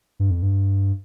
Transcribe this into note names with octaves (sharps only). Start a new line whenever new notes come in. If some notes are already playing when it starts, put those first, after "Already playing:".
G2
F2
G2